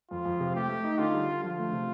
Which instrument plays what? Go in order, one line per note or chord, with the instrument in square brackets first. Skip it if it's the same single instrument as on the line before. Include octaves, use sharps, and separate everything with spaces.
[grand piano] F2 [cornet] F4
[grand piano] F2
C3
[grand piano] A3 [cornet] G4
[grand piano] A3
D#4
[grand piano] D3 [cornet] F4
[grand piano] G3
D3
[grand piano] F3 [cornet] F4
[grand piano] A3
C3